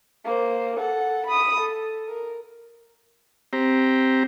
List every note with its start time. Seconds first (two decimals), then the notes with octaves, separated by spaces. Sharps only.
0.25 A#3 C5
0.79 A4 F#5
1.26 B5 D#6
1.61 A4
2.09 A#4
3.53 C4 G4 A#5